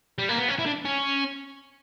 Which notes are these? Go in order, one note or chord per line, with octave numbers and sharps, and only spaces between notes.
G3
A#3
B3
C#4
E4
D4
C#4